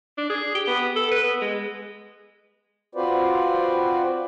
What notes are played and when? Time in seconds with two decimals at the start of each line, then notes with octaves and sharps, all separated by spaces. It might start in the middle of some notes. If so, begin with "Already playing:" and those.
0.18 D4
0.30 G#4
0.55 G4
0.67 B3
0.96 A4
1.11 B4
1.23 B3
1.41 G#3
2.95 C4 F4 F#4 B4 C5 D5